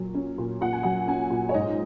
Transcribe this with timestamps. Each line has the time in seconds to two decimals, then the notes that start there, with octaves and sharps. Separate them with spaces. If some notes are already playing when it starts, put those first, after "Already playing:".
Already playing: A#2 F#3
0.15 C#4
0.38 A#2
0.61 A#2 F#5
0.73 G#5
0.83 F#3 F#5
1.07 C#4 G#5
1.31 A#2
1.49 C#5
1.54 G#2 D#5